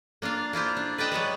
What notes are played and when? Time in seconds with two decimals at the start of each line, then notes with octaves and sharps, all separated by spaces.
0.22 A#3 D4 F4 F5
0.53 A#3 E4 F4 C5
0.77 D4
0.98 B4 D5 D#5 G5 A5
1.11 F#3 G#3 B3 B4